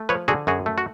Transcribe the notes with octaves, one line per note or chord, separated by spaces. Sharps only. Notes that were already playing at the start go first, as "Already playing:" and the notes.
Already playing: A3
F3 B4 C#5
D3 F#4 G#4
F#2 F#4 G#4
A3
F#4